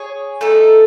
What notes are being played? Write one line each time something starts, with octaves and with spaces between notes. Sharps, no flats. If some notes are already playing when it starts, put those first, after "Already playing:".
Already playing: G#4 C#5 G#5
A3 D#4 A4